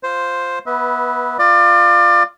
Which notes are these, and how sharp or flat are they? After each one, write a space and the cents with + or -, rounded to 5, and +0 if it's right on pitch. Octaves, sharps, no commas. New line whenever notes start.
F4 +5 C5 +0
B3 -20 B4 +0 E5 -30
F4 +0 D5 +30